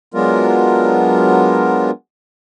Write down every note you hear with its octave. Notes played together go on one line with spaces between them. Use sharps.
F#3 G#3 B3 D4 F4 A#4